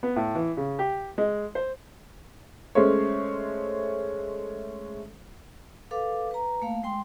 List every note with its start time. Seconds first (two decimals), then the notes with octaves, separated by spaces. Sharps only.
0.03 B3
0.16 A2
0.35 E3
0.57 C#3
0.79 G4
1.18 G#3
1.55 C5
2.75 G#3 A3 C#4 C5 C#5
5.91 A4 B4 F5 D6
6.31 B4 A#5
6.62 A3 A#3 F5
6.83 G#3 G5 C6